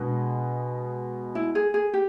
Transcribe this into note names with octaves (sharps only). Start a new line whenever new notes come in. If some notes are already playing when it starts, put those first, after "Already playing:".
Already playing: B2 G#3 B3 D4
E4
G#4
G#4
G4